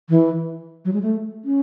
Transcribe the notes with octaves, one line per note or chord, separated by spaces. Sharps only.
E3
F#3
G#3
A3
C#4